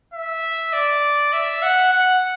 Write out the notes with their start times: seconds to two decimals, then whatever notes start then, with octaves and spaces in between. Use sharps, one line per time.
0.14 E5
0.73 D5
1.33 E5
1.63 F#5
1.93 F#5